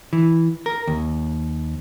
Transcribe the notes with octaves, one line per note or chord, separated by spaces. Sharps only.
E3
A#4
D#2